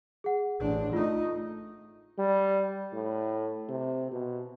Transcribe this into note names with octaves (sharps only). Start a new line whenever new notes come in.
G#4 F#5
A1 D4
A3 D#4 F4
G3
A2
C3
B2